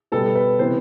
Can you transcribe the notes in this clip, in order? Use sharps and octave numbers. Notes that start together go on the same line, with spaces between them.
B2 G3 B3 A4
B4
C3 E3 B3 C5